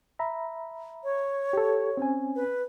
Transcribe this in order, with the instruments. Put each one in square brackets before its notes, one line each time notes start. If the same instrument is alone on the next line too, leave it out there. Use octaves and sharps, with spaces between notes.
[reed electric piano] E5 A#5 B5
[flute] C#5
[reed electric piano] G4 A4
C4 C#4 G#5
[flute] B4